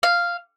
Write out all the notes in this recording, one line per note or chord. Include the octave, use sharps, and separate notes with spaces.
F5